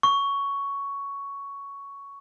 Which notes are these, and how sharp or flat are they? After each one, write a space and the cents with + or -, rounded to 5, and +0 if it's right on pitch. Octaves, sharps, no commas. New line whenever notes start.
C#6 +10